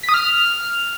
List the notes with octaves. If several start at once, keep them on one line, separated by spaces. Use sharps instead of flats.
B6
D#6
F6